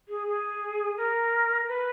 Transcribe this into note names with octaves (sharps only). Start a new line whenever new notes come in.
G#4
G#4
A#4
B4